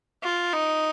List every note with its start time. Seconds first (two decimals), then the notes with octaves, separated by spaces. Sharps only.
0.23 F4
0.53 D#4